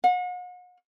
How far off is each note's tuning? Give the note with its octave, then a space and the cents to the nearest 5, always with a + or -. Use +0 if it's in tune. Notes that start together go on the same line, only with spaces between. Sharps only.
F#5 -40